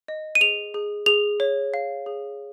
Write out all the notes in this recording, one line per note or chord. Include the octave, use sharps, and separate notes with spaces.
D#5
D#7
G#4 F7
G#4
G#4 F7
C#5
F5
G#4